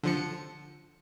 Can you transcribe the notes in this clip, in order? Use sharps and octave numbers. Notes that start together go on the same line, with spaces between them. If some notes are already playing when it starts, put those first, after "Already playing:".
D3 F3 C#7